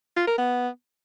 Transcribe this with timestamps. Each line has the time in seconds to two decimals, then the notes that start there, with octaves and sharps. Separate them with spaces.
0.17 F4
0.27 A#4
0.38 B3